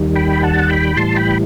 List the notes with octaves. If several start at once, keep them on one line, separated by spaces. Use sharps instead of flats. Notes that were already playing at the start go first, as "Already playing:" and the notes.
Already playing: D#2 D#3 G3
G5 B5
F#5 A5
G5 B5
A2 E3 G3 A5 C6
G5 B5